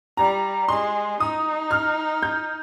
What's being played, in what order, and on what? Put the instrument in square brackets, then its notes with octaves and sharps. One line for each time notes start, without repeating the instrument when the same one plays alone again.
[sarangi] G3 [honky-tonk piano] A#5
[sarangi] G#3 [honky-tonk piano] C6
[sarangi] D#4 [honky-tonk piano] D#6
[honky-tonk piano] F6
G6